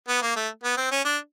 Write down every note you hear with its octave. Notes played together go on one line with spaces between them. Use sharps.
B3
A#3
A3
B3
C4
C#4
D4